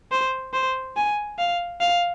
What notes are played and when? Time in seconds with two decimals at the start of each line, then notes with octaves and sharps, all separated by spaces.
0.11 C5
0.53 C5
0.96 G#5
1.39 F5
1.81 F5